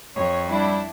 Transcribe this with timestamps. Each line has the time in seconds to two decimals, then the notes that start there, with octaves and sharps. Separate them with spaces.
0.16 F2 C#5
0.48 G3 D4 E4